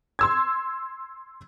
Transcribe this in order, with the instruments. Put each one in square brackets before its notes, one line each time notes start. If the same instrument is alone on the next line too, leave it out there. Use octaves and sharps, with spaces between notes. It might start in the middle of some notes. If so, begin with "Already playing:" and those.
[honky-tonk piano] C6 E6 G#6